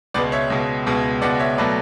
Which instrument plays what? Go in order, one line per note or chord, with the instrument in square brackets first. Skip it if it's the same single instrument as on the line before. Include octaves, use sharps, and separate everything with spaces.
[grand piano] C#2 B2 G#3 B4 D5
C#5 E5
C#2 B2 G#3
C#2 B2 G#3
C#2 B2 G#3 D5 F#5
C#5 E5
B2 F#3 A3 B4 D5